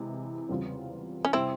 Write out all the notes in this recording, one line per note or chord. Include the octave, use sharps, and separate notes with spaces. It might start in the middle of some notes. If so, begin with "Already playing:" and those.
Already playing: C3 E3 G#3 E4
E2 C#3 G3 C4 F4
C#4
C3 G3 C4 E4